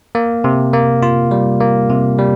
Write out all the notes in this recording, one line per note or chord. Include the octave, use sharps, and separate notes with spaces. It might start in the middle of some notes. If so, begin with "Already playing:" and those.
A#3
C3
A#3
F4
G3
A#3
C3
G3